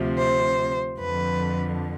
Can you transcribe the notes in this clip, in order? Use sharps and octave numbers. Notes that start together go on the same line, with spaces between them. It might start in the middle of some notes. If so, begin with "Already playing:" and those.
Already playing: D2 C3 F3
C5
F2 D3 F3 B4